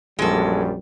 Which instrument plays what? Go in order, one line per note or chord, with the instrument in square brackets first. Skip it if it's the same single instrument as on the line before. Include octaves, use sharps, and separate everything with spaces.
[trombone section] A#1 F#2 G3 [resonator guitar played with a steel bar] G#3 A4